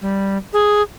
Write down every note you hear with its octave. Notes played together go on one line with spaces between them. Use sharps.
G3
G#4